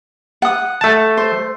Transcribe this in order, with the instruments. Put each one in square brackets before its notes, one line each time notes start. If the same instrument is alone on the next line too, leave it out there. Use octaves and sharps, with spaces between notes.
[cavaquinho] F#5 D#6
[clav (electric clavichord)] A3 A5
[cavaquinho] C5